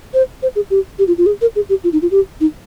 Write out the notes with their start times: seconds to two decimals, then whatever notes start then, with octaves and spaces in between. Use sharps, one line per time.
0.14 C5
0.42 C5
0.56 G#4
0.70 G4
0.99 G4
1.07 F4
1.18 F4
1.26 G#4
1.41 A#4
1.56 G#4
1.69 G4
1.84 F4
1.93 D#4
2.02 F4
2.11 G4
2.40 D#4